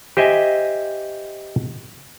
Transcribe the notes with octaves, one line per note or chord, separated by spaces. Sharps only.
G4 C5 D#5 E5 G#5